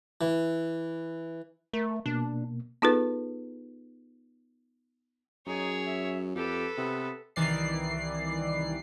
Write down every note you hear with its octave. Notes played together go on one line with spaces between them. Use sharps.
E3
A3 A#4
B2 A#3 D4
B3 D#4 F4 G#4 A4 B4
F#2 D#4 G#4 C#5
E5
F2 G4 A4 B4
C3 B3
C2 D#3 E3 D5 C7